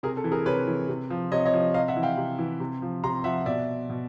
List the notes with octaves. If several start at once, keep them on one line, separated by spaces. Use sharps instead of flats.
C3 G#4 A#4
A4
E3
G#4 A#4
C3 B4 C#5
E3
C3
F3
C3 C#5 D#5
C#5 D#5
F3
C3 D#5 F5
E5 F#5
E3
F5 G5
C3
E3
C3
F3
C3 A#5 C6
F3 E5 F#5
B2 D5 E5
B2